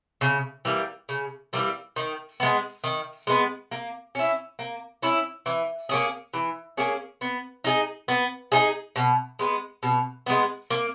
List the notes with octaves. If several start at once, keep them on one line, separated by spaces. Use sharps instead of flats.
C#3
E3 G3 A#3
C#3
E3 G3 A#3
D#3
G#3 B3
D#3
G#3 B3
A#3
C#4 E4
A#3
C#4 E4
E3
A#3 C#4 G#4
E3
A#3 C#4 G#4
B3
D#4 G#4
B3
D#4 G#4
B2
G#3 B3
B2
G#3 B3
A#3